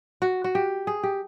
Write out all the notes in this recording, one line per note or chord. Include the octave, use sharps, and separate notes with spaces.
F#4
F#4
G4
G#4
G4